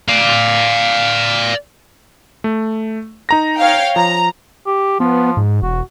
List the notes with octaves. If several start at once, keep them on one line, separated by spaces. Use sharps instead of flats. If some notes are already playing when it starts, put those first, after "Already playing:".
D5 F5
A3
D#4 A#5 A#6
C#5 F5 G5
F3 A#5
G4
F3 B3
G#2
E1 F#4